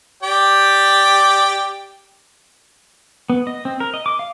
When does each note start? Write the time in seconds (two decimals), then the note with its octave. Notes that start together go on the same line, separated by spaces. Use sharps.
0.23 G4 D5 G5
3.30 B3
3.47 D#5
3.65 C4
3.80 A#4
3.94 D#5
4.06 D6
4.19 F5